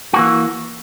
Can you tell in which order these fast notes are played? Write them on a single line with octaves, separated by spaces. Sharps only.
F#4 A#3 E3